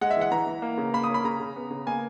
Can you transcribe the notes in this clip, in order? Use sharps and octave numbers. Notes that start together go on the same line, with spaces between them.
G#3 F#5
E5
E3 F#5
E3 A#5
E3
A#3
C#3
A#3 B5
D#6
C#4 B5
C#3 A#5
C#3
B3
C#3
A#3 G#5